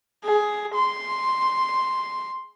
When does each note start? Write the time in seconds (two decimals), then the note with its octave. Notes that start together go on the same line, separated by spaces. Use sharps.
0.25 G#4
0.75 C6